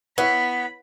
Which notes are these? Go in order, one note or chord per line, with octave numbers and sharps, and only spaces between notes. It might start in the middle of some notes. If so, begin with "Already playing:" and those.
B3 E4 B4 C#5 B5